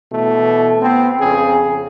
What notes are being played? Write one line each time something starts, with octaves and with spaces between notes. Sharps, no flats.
B2 E3 A3
B3 C4
F2 C#3 G#4